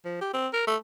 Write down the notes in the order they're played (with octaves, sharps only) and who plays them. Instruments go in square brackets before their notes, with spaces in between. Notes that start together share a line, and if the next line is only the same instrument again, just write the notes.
[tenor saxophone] F3
G4
C4
A#4
A3